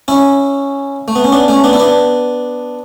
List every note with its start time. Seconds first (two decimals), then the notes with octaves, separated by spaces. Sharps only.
0.08 C#4 E4
1.08 A3
1.15 B3
1.24 C#4
1.32 B3 D4
1.48 A3 C#4
1.64 B3 D4
1.73 E4
1.80 B3 D4